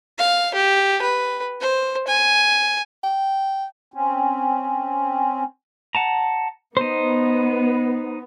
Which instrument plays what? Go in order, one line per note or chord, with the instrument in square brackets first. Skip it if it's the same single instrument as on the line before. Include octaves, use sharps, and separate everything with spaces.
[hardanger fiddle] F5
G4
B4
C5
G#5
[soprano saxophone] G5
[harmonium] C4 C#4
[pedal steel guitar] F#5 A5 A#5
[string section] B3 [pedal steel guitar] D#4 C5